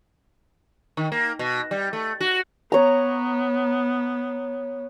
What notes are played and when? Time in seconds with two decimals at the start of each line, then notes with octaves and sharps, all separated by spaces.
0.97 D#3
1.12 A#3
1.39 B2
1.71 G3
1.93 A3
2.21 F#4
2.72 B3 C#5 A#5